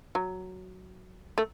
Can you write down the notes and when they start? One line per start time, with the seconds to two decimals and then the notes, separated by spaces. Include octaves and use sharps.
0.15 F#3
1.38 A3